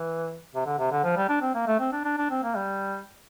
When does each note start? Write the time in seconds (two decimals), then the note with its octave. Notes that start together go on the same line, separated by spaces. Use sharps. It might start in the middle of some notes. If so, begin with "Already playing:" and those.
Already playing: E3
0.55 C3
0.66 D3
0.79 C3
0.92 D3
1.04 F3
1.17 G3
1.29 D4
1.42 C4
1.55 A#3
1.67 A3
1.80 C4
1.93 D4
2.05 D4
2.18 D4
2.30 C4
2.44 A#3
2.55 G3